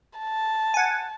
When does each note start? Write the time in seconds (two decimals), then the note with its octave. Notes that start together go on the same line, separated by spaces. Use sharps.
0.19 A5
0.74 F#5 G#5